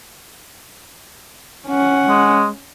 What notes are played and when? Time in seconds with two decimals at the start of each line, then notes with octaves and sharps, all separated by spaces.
1.68 C#4 F#5
2.09 G#3